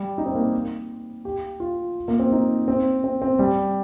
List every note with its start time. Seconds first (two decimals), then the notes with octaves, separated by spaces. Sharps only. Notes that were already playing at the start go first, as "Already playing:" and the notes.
Already playing: G3
0.18 D#4
0.26 C4
0.35 A#3
1.25 G4
1.60 F4
2.08 A#3
2.19 C4
2.32 D#4
2.68 C4
3.04 C4
3.22 C4
3.39 G3